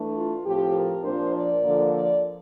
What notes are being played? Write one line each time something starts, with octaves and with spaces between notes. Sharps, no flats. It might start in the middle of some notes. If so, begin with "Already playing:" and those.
Already playing: E3 A3 D4
F4
A2 F3 C4 G4
A#4
A#2 F3 A#3 D4 C5
D5
D3 F3 A#3
D5